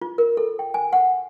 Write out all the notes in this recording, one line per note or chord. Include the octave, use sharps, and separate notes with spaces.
F4
A#4
A4
G5
G#5
F#5